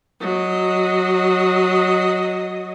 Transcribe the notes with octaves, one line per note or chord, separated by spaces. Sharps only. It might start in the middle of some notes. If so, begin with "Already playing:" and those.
F#3 D#5